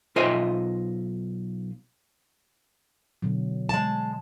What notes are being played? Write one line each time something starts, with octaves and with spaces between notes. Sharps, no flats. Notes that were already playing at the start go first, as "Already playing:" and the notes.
B1 F4 C5 D#5 E5
B2 D3 F#3
G#3 A5